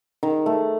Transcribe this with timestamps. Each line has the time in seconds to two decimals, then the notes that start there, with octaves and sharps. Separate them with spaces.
0.23 D#3
0.46 A3